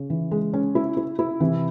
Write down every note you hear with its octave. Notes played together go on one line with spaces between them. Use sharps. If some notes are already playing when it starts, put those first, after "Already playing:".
Already playing: C#3 C#4
E3
G#3
C#4
E4
E4
E4
C3 E3